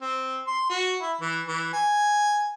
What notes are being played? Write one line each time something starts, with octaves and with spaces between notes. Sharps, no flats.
C4
C6
F#4
E4
E3
E3
G#5